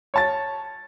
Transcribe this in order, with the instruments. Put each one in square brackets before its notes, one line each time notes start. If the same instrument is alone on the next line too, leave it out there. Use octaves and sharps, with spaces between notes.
[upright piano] C#5 A5 A6